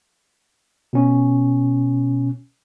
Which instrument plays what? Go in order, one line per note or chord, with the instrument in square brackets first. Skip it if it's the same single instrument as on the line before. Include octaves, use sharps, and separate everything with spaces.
[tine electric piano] B2 C#4